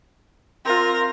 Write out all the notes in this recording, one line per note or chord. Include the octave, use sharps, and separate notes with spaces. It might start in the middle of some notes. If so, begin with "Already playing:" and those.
C4 F4 A#4